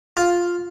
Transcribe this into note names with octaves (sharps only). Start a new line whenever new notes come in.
F4